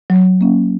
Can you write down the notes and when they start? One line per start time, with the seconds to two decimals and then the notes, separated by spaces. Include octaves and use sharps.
0.10 F#3
0.41 A#3 C#4